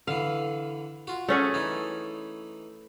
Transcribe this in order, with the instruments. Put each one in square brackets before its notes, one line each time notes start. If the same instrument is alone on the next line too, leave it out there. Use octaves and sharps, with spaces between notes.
[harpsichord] D3 E3 [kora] F5
[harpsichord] F4 F#4
[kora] A3 C#4 G#4
[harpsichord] E3 D#4